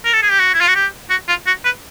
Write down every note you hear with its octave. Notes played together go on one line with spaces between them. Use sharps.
A#4
A4
G#4
G4
F#4
E4
F4
F#4
G4
F#4
F4
F#4
B4